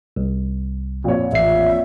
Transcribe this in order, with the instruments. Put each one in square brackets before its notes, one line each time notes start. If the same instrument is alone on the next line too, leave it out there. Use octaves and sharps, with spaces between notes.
[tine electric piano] C2
[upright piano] A#1 F2 C#5
[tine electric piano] A1 C7 [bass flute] E5